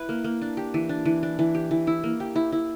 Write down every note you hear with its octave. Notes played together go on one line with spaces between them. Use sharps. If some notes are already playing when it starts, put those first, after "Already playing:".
Already playing: E4 B4
A#3
A#3
D4
G4
E3
D4
E3
D4
E3
G4
E3
E4
A#3
G4
E4
E4